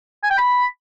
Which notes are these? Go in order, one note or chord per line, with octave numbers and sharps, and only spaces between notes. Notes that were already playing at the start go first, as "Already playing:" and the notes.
G#5
G5
B5